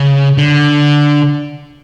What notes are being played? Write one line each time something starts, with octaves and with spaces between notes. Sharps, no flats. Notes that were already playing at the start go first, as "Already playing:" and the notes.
Already playing: C#3
D3